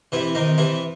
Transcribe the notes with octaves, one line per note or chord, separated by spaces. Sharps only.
C3 E3 E4
C3 D#3 D#4
C3 E3 E4